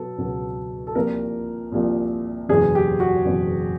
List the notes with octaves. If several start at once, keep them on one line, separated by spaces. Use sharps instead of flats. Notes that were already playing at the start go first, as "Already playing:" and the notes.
Already playing: B2 F#3 B3 A4
C#2 B2 F#3 B3
A4
C2 A#2 F3 A#4
C2 A#2 F3
F#1 E2 B2 G#4
G4
F#4
F#1 E2 B2